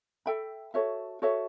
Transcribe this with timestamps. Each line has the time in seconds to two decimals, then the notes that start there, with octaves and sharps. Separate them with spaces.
0.26 A4 E5 G5 B5
0.74 F#4 A4 C#5 E5
1.22 F#4 A4 C#5 E5